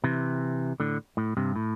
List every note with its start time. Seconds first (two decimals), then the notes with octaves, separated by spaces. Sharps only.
0.04 C3 E3
0.80 A2 D3
1.17 A2
1.37 G2 C3
1.56 A2